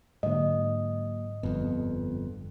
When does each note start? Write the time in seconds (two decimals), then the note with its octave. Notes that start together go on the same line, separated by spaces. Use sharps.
0.23 G#2 D3 F#3 A#3 D#5
1.43 G1 F2 B3